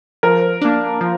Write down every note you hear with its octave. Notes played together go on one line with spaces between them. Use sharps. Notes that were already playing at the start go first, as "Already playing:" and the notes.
F3 A#4
A#3 D4
F3